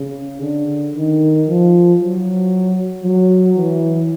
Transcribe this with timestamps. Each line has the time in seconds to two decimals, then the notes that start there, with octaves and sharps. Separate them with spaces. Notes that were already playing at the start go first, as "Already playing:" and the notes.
Already playing: C#3
0.41 D3
0.95 D#3
1.47 F3
2.00 F#3
3.04 F#3
3.56 E3